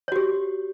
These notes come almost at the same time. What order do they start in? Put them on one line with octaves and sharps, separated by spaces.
C#5 F#4 G4